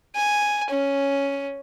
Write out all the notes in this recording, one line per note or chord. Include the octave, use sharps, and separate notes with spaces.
G#5
C#4